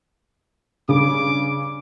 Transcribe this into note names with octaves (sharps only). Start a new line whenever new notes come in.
G2 C#3 D6